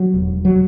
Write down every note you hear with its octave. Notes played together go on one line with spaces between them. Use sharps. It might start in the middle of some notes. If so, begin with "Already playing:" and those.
Already playing: F#3
E1
F#3